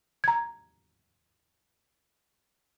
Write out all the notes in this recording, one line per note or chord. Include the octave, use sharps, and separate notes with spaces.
A#5 G#6